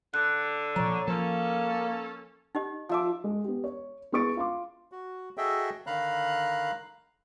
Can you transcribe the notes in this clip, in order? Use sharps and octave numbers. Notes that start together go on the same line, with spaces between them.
D3 F#6
A#2 F3 C#5 A#5
F3 A#3 C#4 A4
D#4 G4 D#5
F3 E5 D6
G#3
B3 G4
C#5
B3 E4 G#4 C#6 A6 D7
F4 F5 C6 D6
F#4
F#4 G#4 A4 D#5 E5 G5
D3 D#3 F5 A#5 B5 F#6